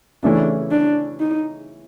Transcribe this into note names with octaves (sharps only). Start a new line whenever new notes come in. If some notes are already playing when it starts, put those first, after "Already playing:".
C#3 E3 A3 C#4 D4 E4
D4
D#4